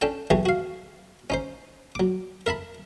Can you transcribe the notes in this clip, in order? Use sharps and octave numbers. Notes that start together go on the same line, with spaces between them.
C#4 D4 A4 G5 A5
B1 E3 G4 G#4 C#6
F#4 F5
C#4 D#4 C5
F#3 D6
A#4 E5 A5 B5